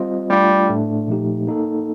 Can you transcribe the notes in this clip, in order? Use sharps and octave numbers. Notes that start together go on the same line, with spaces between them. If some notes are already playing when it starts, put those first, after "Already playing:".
Already playing: G3 C4 F4 C5 D#5
G3 A3 D4 F4
A2 A3 D4
A#2 F3 A3 D#4 G4
A#3 D#4 A4